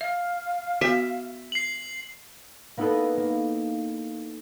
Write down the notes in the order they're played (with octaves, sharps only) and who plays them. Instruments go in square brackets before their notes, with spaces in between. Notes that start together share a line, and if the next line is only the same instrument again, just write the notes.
[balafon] E5 [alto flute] F5
[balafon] B3 F#4 [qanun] E5
[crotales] C7 F#7
[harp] A#3 B3 D#4 E4 A4 B4
A#3